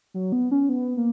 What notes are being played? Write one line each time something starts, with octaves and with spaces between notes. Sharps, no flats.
F#3
B3
C#4
B3
A#3